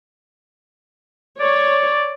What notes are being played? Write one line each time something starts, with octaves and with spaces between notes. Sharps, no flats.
C#5 D5